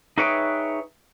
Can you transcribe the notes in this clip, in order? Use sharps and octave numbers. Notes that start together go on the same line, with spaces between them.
D#4 G#4 B4 C#5 E5 G5